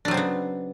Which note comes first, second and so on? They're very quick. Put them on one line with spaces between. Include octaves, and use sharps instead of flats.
D4 F#3 C4 C#3 B3